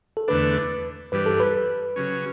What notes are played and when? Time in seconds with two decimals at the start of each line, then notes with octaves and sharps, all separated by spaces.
0.17 A4
0.28 E2 D3 A3 D4 B4
1.12 G2 E3 G3 B4
1.26 A4
1.40 B4
1.96 C#3 F#3 C#4